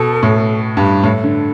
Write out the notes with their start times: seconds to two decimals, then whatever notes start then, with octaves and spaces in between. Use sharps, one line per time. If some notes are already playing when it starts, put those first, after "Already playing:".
Already playing: B2 A4
0.23 A2
0.77 G2
1.03 A2 A4
1.24 D3